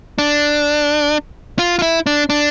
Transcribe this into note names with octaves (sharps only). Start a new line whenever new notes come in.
D4
F4
F4
E4
D4
D4